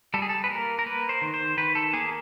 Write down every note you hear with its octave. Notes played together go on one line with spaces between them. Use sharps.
G3 A4
G#4
A4
B4
A#3 A#4
A#4
A#3 B4
C5
D#3
C5
D#3 B4
A4
A#3 G#4